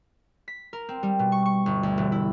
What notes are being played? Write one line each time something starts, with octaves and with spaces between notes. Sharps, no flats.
B6
A#4
C4
G3
B2
C#6
C#6
G1
D2
E1
E4